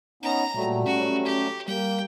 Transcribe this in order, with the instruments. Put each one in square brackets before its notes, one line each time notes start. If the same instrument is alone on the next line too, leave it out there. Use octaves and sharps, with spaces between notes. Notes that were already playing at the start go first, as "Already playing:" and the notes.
[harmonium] B3 C#4 D#4 [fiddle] A#5
[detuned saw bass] A#2 [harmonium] F#3 G3 A3
[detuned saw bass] C#4 [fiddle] F#4
[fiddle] G4
[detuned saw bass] G3 [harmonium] A#3 [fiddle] G5